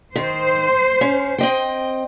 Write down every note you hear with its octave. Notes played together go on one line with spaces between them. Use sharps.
D#3 C5
C#4
C4 D#5 G5